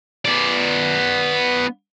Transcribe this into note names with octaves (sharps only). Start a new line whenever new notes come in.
B3 D5